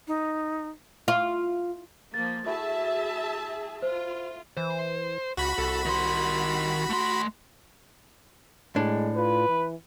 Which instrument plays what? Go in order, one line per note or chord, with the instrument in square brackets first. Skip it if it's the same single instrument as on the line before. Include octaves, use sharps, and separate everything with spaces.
[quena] D#4
[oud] F4
[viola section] F3 A#3 [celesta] A6
[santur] A3 E4 F#4 [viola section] G#4 E5 A5
[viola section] F4 [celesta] C5
[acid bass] E3 [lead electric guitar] C5
[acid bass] C#2 [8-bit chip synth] F#4 B5
[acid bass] C2 [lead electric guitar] A4
[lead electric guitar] D#3 C6
A3 C6
[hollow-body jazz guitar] A2 D4 [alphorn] G#3
[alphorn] F4 [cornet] B4
[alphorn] E3